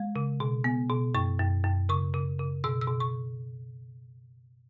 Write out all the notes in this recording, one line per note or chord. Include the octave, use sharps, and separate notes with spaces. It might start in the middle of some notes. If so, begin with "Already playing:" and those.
Already playing: G#3
C#3
B2
B3
B2
F#2 C#6
F#2
F#2
C#3 C#6
C#3
C#3
B2 E6
E6
B2
C#6